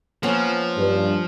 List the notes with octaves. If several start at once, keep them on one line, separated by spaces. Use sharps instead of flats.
F3 A#3 B3 C#4
G2